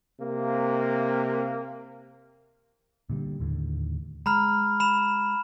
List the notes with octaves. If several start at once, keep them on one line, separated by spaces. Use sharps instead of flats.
C3 A#3
A#2 D3 G3
D#2 A2 D3
G#3 A#5 B5 F6
B5 E7